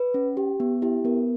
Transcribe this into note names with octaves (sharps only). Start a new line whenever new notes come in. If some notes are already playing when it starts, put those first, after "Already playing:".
Already playing: B4
C#4
G4
B3
E4 G4
B3 A#4